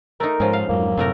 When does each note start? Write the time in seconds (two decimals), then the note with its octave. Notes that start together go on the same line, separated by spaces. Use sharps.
0.20 A3 D#4 A#4
0.40 G#2 F3 C#4
0.53 F5
0.69 F2 G#2 F#3 A#3
0.97 F#2 A2 C3 A3 A#4